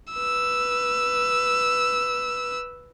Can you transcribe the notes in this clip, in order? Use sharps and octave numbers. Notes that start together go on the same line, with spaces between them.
B4 E6